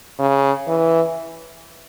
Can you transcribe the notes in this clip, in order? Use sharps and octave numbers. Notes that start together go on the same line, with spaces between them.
C#3
E3